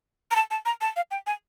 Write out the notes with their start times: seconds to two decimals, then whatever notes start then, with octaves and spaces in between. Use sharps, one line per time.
0.31 A#5
0.36 A5
0.51 A5
0.66 A#5
0.81 A5
0.96 F5
1.11 G5
1.27 G#5